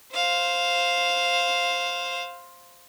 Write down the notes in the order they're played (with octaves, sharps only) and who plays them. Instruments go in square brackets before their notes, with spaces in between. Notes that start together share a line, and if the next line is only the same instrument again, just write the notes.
[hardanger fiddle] C5 F5